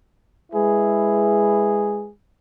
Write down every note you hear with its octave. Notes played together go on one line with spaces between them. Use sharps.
G#3 E4 G#4 B4